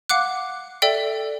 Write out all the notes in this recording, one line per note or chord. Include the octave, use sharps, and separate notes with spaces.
F5 F#5 D6 F#6
A4 D5 E5 G5